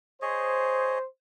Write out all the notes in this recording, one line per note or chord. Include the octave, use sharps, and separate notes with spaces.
G#4 C5 C#5 D#5